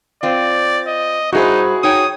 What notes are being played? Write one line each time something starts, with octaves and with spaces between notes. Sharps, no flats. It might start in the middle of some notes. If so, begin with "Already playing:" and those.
C4 F4 D5
D#5
G2 D#4 E4 F#4 G#4 C5
D#4 C#5 G5 D#6